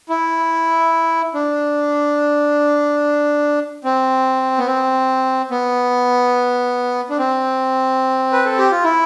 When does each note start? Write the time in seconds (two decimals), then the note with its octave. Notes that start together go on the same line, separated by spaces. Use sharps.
0.09 E4
1.34 D4
3.84 C4
4.59 B3
4.67 C4
5.51 B3
7.10 D4
7.18 C4
8.32 B4
8.45 A4
8.58 G4
8.71 F4
8.84 E4